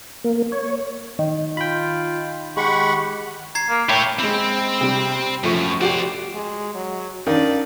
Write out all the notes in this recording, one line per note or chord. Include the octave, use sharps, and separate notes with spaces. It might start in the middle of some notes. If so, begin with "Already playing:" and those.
A#3
C#5
D#3
F4 G5 B5
G#3 G4 F#5 B5 C#6
A#5 G#6 C7
A#3
E4 C#5 G5
G#3 C4 B5
C3 G3
F#2 F3 A3 C#6
F#4 G4 C5 D5
G#3
F#3
D#3 C#4 D4 A#4 D5 F5